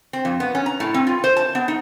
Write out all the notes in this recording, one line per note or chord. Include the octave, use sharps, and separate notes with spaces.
C4
F2
B3
C#4
A#5
A2
C4
F4
C5
A5
B3
D#4